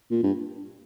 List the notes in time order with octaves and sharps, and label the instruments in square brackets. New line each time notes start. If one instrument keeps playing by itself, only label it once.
[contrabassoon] A#2
G2